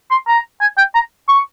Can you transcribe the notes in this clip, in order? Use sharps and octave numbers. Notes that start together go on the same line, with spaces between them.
C6
A#5
G#5
G5
A#5
C#6